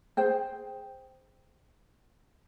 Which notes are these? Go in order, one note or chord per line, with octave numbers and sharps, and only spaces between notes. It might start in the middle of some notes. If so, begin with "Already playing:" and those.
G#4 C5 G5